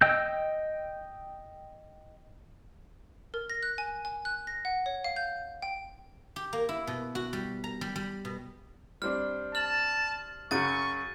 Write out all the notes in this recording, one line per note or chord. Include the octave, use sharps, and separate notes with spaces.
D#5 G5 E6 G6
A#4
A#6
F#6
G#5
G#5
F#6
A#6
F#5
C#5
F5
G6
G5
G4
A#3
E4
B2
F#4
G3
A#5
G3
G3
B2
G3 C4 D4 F6
A5 F6 F#7
F#2 C#3 F#3 C#6 A6 D#7